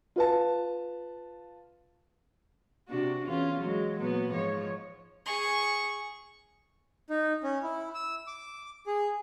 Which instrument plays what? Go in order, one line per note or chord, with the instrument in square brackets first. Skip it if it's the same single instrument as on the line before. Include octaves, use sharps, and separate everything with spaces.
[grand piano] F4 B4 A5
[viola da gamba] C3 D4 F#4
E2 C#4 F4
F#3 G#3
A#2 F#3 B3
G#2 F3 C#5
[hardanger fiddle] G#4 C#6
[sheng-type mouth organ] D#4
C#4
E4
E6
D6
G#4